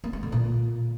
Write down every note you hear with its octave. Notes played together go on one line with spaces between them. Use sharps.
A#3
G#3
D3
A#2